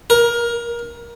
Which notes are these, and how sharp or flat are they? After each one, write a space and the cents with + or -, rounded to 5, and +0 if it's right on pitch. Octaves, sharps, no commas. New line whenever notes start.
A#4 +20